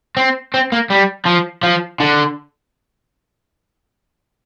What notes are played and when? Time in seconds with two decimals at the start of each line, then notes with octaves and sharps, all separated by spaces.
0.17 C4
0.54 C4
0.72 A#3
0.91 G3
1.26 F3
1.63 F3
2.00 D3